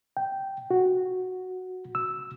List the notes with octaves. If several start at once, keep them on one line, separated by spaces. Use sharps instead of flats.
G5
F#4
E6